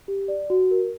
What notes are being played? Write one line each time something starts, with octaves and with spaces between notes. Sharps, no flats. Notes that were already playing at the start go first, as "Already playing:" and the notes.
G4
D5
F#4
A#4